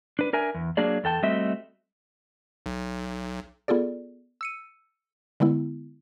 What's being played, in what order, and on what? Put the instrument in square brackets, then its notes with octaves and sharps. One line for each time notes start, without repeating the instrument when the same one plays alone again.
[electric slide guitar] D4 B4
D4 A#4 E5 G#5
E2
F#3 A#3 D4 G#4 D5
E2 A4 G5 A5
G3 A3 C4 F#4 D#5 E5
[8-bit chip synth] B1
[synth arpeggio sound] B3 F4 G#4 A4 D5
E6 C#7 D#7
D3 G#3 B3 E4